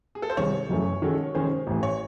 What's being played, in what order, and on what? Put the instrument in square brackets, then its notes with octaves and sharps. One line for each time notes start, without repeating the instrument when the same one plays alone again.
[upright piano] G#4
A4
C5
[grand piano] C2 C3 D#3 G#3 [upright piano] C#5
[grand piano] F#1 F#2 E3 A3
D#3 G#3 C#4 F#4 A4
D#3 G#3 C#4 G#4 C5
A1 A2 E3
[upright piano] C#5